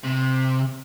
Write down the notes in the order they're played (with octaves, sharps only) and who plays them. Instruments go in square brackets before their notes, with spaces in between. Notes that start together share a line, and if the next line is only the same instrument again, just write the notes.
[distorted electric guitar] C3